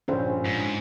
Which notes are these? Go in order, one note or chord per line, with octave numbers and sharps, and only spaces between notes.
A#1 G2 A#2 C#4 C5
G#2